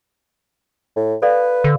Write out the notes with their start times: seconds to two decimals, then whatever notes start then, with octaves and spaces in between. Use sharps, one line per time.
0.96 A2
1.22 A4 B4 D5 F5
1.64 D3